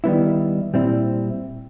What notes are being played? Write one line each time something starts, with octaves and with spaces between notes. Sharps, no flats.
D#3 G3 B3 E4
A#2 G3 C4 E4